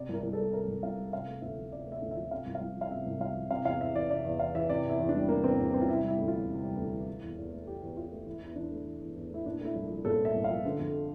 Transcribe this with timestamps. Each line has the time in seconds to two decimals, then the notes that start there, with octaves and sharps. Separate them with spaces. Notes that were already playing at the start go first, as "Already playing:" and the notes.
Already playing: C3 D5
0.09 C2 A#4
0.23 C2
0.33 A4
0.38 G3
0.53 C3 A#4
0.68 C2
0.83 C2 F5
0.98 G3
1.13 C3 F5
1.27 A3
1.42 D2 E5
1.58 F3
1.72 C3 D5
1.87 A3
1.92 E5
2.02 D2
2.11 E5
2.16 F3
2.31 C3 F5
2.46 C2
2.55 F5
2.61 C2
2.76 F3
2.81 F5
2.91 C3 E5
3.06 C2
3.20 C2 F5
3.36 F3
3.51 C3 F5
3.65 E2 F5
3.81 E2 E5
3.95 E3 D5
4.10 C3 D5
4.24 E2
4.39 E2 F5
4.55 E3 E5
4.69 C3 D5
4.85 E2 E4
5.00 E2
5.09 D4
5.14 G3
5.29 C3 A#3
5.44 E2 C4
5.59 E2
5.74 G3 C4
5.81 F4
5.89 C3 E4
6.04 G3 E4
6.18 D2
6.28 F4
6.33 E3
6.49 C3
6.63 G3
6.77 D2
6.93 E3
7.08 E3
7.23 E2
7.37 E2
7.52 A3
7.67 E3 G4
7.82 E2
7.96 E2 F4
8.12 A3
8.27 E3 E4
8.42 E2 E4
8.56 E2 D4
8.71 A3
8.86 E3
9.01 E2
9.16 E2
9.30 A3 E4
9.46 A#2 D4
9.61 A3 E4
9.76 C2
9.90 F3
10.05 A#2 A4
10.19 A3
10.25 E5
10.35 C2
10.44 F5
10.50 F3
10.65 D3
10.79 F2